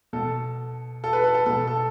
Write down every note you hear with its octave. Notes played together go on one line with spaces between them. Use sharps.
B2 A4
A4
B4
A4
A4
B2 A4
A4